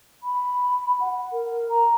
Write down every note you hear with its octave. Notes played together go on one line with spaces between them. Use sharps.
B5
F#5
A#4
A#5